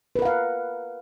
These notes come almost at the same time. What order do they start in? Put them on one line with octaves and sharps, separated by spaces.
B4 A#4 F#5 F5